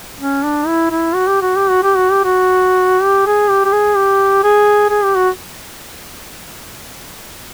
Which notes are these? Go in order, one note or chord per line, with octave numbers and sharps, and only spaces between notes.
C#4
D4
E4
E4
F#4
G4
F#4
G4
F#4
G4
F#4
G4
F#4
G4
G#4
G4
G4
G#4
G4
G#4
G#4
G4
F#4